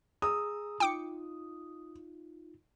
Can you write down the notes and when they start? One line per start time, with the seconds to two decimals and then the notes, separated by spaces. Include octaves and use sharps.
0.22 G#4 A#5 D#6 E6
0.80 D#4 F4 G5 D6 C#7